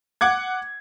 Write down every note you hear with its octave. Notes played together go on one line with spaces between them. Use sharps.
F#5 D6 G#6